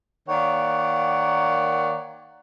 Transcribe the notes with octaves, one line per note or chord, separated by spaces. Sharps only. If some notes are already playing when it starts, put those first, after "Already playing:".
D#3 A#3 C#5 D5 F#5